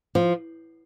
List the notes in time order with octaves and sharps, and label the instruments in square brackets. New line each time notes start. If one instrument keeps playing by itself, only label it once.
[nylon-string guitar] F3